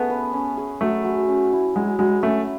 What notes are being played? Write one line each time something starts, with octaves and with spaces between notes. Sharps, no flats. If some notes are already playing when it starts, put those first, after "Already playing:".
Already playing: A3 B3 C#4 G#4
B4
C#4
G#4
F#3 A3
F#3
C#4
E4
F#3 G#3
F#3 G#3
A3 C#4